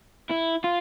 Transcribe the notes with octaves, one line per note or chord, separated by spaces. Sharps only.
E4
F4